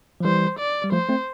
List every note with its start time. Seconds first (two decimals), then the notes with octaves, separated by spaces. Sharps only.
0.20 F3
0.24 E3 G3 C5
0.59 D5
0.84 G3
0.92 F3 A3 C5
1.09 A3 C4